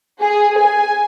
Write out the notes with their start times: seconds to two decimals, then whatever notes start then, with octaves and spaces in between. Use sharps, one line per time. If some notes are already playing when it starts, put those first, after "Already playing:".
0.21 G#4
0.59 G#5